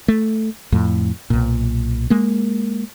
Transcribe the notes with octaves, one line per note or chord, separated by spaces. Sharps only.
A3
F2 A2
B1 A#2
G#3 A#3